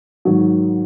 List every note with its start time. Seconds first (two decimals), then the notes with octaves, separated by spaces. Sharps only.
0.25 G#2 D#3 F#3